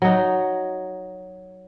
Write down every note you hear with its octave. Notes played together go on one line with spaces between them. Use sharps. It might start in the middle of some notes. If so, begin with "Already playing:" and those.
F#3 D#4